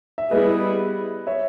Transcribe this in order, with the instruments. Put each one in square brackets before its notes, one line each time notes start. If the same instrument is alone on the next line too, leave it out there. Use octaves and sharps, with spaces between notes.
[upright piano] E5
[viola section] G3 B3 E4 G#4 [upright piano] B4 D#5
[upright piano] C#5 E5